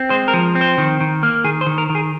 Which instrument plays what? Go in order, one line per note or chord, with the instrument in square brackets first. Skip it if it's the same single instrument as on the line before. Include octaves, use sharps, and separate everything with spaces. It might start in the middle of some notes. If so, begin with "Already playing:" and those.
Already playing: [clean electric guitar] C4
G#3 C5
A#4
F3
C4
C5
D#3
D#3
A#3
D#3 G#4
C5
D#3
A#4
D#3
G#4